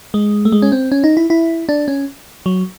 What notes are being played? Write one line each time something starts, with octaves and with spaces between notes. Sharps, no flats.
G#3
A3
G#3
C#4
C4
C#4
D#4
E4
E4
D4
C#4
F#3